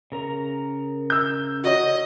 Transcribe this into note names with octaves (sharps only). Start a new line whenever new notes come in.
C#3 A#4 A#5
E6 G6
F#4 C#5 D#5